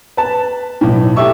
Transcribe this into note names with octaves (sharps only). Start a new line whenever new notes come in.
B4 A5
B1 A2
G4 A4 E5 C#6 E6